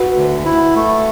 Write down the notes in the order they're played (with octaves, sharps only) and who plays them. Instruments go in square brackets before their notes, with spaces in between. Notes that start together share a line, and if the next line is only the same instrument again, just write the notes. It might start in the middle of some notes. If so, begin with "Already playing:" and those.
Already playing: [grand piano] F#4 B4
[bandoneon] D2
E4
A3